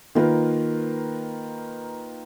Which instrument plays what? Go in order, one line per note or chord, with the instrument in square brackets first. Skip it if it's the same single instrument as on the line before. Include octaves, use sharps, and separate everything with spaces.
[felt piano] D#3 A#3 F4 A#4 B4